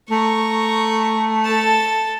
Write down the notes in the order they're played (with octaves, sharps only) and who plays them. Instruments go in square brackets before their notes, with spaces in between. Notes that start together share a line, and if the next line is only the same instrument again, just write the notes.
[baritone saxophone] A3 [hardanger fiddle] A#5 C#6
[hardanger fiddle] A4 A5